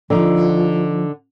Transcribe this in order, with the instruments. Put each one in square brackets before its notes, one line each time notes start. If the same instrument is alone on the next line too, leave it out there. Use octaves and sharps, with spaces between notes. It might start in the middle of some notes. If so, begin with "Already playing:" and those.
[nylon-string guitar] D3 D#4 [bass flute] F3